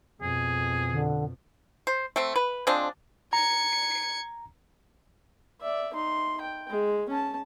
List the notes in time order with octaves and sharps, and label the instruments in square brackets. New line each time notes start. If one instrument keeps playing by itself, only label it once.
[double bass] F2 B2 [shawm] G#4
[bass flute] D3
[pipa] C5
A3 C4
B4
F3 G#3 C4 D4
[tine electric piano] A#5 [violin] G#6 C#7
[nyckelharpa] D5 E5
D#4 C6
G5
G#3
C#4 A5